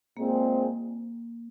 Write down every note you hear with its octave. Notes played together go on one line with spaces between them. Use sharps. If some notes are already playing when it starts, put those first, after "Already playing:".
A#2 G#3 A#3 C4 G#4